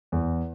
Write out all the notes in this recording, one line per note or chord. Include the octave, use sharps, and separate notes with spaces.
E2